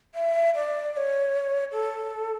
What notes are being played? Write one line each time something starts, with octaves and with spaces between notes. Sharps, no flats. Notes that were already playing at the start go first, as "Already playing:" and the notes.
E5
D5
D5
C#5
A4